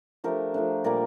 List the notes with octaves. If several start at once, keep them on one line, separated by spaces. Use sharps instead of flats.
F3 A3 D4 G4 A#4
F3 A3 D4
A#2 G3 A#3 A#4 D5